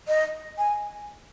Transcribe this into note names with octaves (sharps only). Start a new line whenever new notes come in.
D#5
G#5